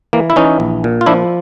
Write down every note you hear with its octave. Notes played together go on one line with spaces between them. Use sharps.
E3 A#3
E4
E3 C#4 D#4
A#1
A#2
F4
F3 D4 E4